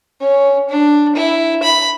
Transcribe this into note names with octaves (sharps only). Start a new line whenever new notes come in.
C#4
D4
E4
B5